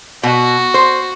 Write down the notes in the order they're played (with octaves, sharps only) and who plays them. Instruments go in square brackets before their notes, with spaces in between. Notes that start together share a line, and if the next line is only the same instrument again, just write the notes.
[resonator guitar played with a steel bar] B2 [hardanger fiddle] F#4
[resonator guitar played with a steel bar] C5